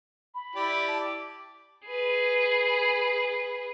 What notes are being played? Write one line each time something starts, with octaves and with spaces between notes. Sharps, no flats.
B5
E4 G4 D5
A5
D6
G#4 B4